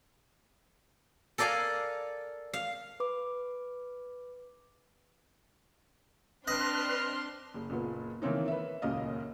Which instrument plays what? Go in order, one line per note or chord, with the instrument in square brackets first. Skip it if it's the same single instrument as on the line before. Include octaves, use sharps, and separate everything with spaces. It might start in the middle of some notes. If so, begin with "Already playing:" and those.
[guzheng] A4 A#4 D5 F5 G#5
F5
[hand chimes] B4 D6
[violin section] C4 D4 C6 [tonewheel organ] B4 [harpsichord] D#5 [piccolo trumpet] F6
[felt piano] F#1
F#1 A#2 B3
D#3 E3 A#3 C4 C#4 D#4
B4 E5
D#1 C#2 F#2 A#3 D#5 F5